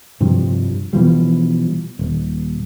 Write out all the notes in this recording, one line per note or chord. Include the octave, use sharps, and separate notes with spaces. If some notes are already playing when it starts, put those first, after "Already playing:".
G2 C3 F3 G3
B2 E3 F3 G3
D#1